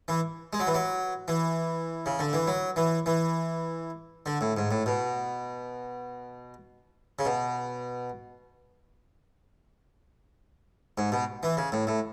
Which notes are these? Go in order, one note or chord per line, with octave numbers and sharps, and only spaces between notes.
E3
G#3
F#3
E3
F#3
E3
C#3
D3
E3
F#3
E3
E3
D3
A2
G#2
A2
B2
C#3
B2
G#2
B2
E3
C#3
A2
A2